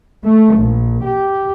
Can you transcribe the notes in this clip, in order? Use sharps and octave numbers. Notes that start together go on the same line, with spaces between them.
A3
A#1
G4